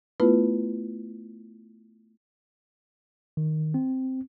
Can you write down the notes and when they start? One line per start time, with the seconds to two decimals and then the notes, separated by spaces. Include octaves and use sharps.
0.20 A3 B3 E4 F4 B4
3.37 D#3
3.74 C4